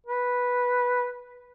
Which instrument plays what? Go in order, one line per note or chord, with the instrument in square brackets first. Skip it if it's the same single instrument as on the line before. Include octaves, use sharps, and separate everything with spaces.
[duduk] B4